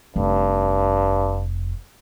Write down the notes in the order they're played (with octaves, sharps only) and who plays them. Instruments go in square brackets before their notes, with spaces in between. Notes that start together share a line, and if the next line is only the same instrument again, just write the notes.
[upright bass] F1 [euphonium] G2